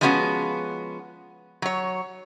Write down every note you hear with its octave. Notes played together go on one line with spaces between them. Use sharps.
F3 G3 G#3 B3 C#4 F#4
F#3 C#5